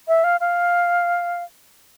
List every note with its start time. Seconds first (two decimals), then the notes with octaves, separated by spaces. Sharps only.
0.08 E5
0.24 F5
0.41 F5